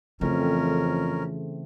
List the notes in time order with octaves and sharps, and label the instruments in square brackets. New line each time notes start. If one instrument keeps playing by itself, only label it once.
[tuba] F2 [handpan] C#3 A3 C4 [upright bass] E3 [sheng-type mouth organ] C#4 A#4